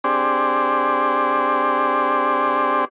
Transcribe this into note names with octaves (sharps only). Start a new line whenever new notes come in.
C4 D4 G4 G#4 C5 D5